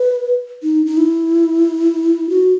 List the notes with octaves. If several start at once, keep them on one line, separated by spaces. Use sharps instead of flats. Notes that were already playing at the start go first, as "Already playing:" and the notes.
Already playing: B4
D#4
D#4
E4
F#4